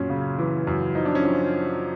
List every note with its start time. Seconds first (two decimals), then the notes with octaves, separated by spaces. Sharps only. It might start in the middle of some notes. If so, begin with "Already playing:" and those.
Already playing: F#2 A#2 C#4
0.10 C#3
0.38 E3
0.67 F#2
0.95 F3 D#4
1.05 D4
1.15 C#4
1.23 F3